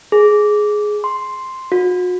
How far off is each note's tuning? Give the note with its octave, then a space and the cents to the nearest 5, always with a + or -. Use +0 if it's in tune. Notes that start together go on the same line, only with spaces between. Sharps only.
G#4 +10
C6 +0
F#4 -40